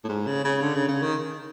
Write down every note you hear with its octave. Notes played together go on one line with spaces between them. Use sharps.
A2
G#2
C#3
C#3
D3
C#3
C#3
D#3